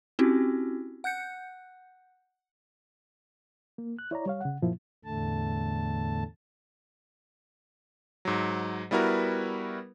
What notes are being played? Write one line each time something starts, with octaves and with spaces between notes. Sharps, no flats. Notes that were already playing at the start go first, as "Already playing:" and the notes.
C4 C#4 E4 F#4 G4
F#5 F#6 G6 C#7
A#3
F#6
E4 C#5 D5 A#5
G3 C#5 F5
C#3 F#5
F#2 A#2 F3 A#3 E4
E2 A2 D3 A3 A5
G#2 F#3
G3 B3 E4 F#4 A#4 B4